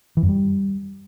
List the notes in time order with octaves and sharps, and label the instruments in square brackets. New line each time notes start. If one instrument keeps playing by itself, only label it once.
[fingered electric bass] E3
F#2
G3